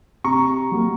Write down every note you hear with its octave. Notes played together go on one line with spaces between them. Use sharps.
C3 A#5 C#6
F#3 A#3